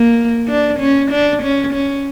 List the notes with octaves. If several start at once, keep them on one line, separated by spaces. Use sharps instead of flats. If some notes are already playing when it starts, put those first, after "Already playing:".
Already playing: A#3
D4
C#4
D4
C#4
C#4